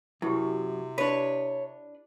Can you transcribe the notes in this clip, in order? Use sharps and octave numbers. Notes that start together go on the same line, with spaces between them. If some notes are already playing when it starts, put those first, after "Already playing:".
F#2 C3 E4 G4
D4 B4 C#5